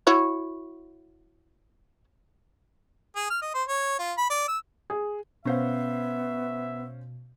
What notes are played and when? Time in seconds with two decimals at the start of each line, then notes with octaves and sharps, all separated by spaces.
0.07 E4 F#4 C#5
3.16 G#4
3.30 F6
3.42 D#5
3.54 C5
3.68 C#5
3.99 F4
4.18 B5
4.30 D5
4.48 E6
4.90 G#4
5.45 B2 B3 C#4 C5 E5 F5